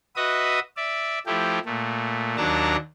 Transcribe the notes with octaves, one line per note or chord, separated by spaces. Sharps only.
F#4 B4 D#5 E5 D#6
D5 E5
F3 A3 E4 G4
A#2 A3
D#2 F#3 D4 A5 A#5